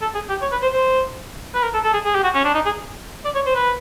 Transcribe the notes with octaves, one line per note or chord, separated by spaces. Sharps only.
A4
G#4
G4
C#5
B4
C5
C5
B4
A#4
A4
A4
G#4
G#4
G4
F#4
C#4
D4
D#4
G#4
D5
C#5
C5
B4